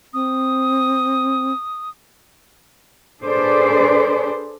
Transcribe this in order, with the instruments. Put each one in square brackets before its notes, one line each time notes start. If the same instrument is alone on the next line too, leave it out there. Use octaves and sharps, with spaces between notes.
[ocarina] C4 [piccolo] D#6
[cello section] D4 G#4 A4 B4 C5 D5